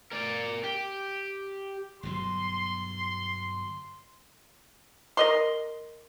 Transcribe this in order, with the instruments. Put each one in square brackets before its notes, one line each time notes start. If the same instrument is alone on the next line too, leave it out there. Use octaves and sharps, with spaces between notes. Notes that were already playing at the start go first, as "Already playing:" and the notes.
[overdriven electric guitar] A#4 D5
G4
[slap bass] G1 B2 F#3 [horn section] C6
[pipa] A#4 D#5 C6